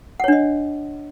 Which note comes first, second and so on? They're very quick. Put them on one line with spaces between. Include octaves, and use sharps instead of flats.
F#5 C#5 D4 D#5